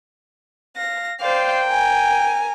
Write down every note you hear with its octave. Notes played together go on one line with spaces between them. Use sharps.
F5 A#6
C5 D5 F5 G5
A#4 G#5